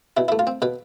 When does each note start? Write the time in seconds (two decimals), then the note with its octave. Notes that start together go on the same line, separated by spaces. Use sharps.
0.17 B2 E4
0.28 A3 E4
0.39 F4
0.47 C4
0.62 B2 B4